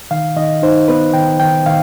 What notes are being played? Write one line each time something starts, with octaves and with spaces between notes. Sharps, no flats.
D#3 F5
D#3 D#5
D#4 C5
B3 B4
D#3 G5
D#3 G5
D#3 F5